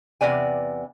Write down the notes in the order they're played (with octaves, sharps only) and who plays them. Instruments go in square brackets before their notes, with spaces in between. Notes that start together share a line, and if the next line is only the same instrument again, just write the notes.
[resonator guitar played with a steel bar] E2 C3 B3 D5 G#5